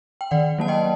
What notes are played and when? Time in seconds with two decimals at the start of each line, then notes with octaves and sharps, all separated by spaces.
0.21 G5
0.31 D#3 D5 F#5
0.58 F#3 A#3 A5
0.68 D#5 G5